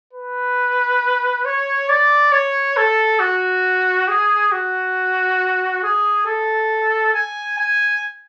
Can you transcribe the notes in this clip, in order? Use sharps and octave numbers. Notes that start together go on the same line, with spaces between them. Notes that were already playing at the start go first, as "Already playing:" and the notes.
B4
C#5
D5
C#5
A4
F#4
G#4
F#4
G#4
A4
G#5
G#5